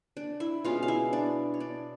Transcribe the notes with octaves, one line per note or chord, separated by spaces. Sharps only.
D4 D5
E4 E5
B2 G#3 C#4 F4 F5
F5
E4 E5
D4 D5
C#5
D4 D5